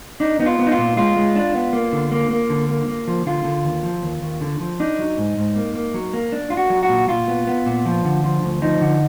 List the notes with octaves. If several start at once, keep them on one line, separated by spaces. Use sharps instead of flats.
D4 D#4
B3 D#4
F4
B3
D#4
F4
A#2
G#3 F4
G#3
D4
B3
A#3
D3
A#3
A#3
D3
A#3
A#3
F3
D3 F4
D3
D#2
F3
D#2
D#2
D3
F3
D4 D#4
F#3
G#2
G#2
A#3
A#3
F#3
A#3
D4
D4 F4
F#4
F#3
F#4
A#2
A#2 F4
B3
B3
A#2
F3
D3
F3
D2
F3 D#4
D3